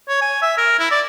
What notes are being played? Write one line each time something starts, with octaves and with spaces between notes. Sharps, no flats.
C#5
G#5
E5
A#4
E4
D5